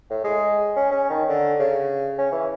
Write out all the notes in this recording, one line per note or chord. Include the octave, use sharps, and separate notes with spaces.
A2
G#3
C#4
C#4
D#3
D3
C#3
C#4
E3